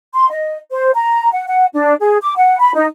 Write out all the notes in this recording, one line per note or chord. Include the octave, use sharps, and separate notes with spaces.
C6
D#5
C5
A#5
F#5
F#5
D4
G#4
D6
F#5
B5
D#4